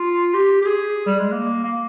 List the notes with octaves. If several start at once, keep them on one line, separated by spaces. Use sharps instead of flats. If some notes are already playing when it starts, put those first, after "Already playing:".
Already playing: F4
G4
G4
G#4
G3
G#3
A#3
A#3